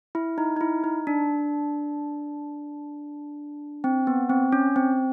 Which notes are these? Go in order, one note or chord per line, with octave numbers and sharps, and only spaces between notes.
E4
D#4
D#4
E4
D#4
D4
C4
B3
C4
C#4
C4